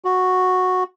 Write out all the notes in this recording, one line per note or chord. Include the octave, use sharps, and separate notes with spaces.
F#4